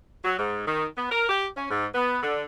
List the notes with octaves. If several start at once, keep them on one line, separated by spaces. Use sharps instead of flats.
F#3
G#2
D#3
B3
A#4
G4
C#4
G#2
B3
D3